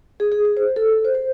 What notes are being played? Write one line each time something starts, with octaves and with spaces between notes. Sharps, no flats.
G#4
G#4
G#4
C5
A4
C5
C5